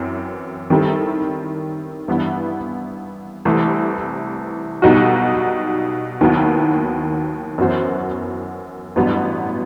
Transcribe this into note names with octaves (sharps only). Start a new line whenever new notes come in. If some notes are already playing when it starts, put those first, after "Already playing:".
Already playing: F#2 E3 C4
D#3 G3 C4 E4 A4
G2 E3 B3 E4
C2 C3 E3 A3 E4
B1 B2 G3 D#4 F#4
D#2 D#3 F#3 B3 E4
F#2 E3 B3 F#4 C5
A1 G2 F#3 B3